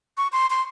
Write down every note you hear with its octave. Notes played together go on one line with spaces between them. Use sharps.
C#6
C6
C6